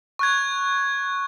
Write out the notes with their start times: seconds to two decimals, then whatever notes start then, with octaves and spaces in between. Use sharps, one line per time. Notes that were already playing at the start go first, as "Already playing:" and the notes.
0.19 C#6 F#6 G#6